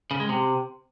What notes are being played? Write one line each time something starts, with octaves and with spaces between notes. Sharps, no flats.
C#3
G#3
C3